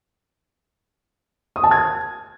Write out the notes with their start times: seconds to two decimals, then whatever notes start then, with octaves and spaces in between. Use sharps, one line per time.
1.56 D#6
1.64 A5
1.71 G#6